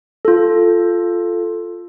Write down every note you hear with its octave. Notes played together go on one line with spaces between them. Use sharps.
F4 A4